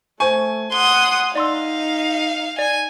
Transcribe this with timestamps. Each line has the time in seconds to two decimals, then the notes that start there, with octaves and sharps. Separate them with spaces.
0.20 A3 C5 G#5 C#6
0.72 F#5 C6 D#6 G7
1.35 D#4 D5 F5 C6 E6
2.59 D5 G#5